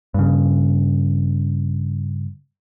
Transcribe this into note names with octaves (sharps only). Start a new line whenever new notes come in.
G2 C#3